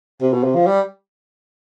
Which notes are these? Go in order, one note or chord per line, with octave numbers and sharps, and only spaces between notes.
C3
B2
C3
F3
G3